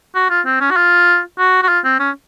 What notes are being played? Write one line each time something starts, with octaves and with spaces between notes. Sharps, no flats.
F#4
F4
C4
C#4
F#4
F4
F#4
F#4
F4
C4
C#4